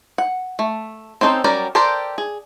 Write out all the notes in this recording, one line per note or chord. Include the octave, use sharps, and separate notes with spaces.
F#5
A3
C4 C#4 D#4 A4 C5
F#3 G3 C#4 A#4 D5
G4 A4 A#4 C5 D5
G#4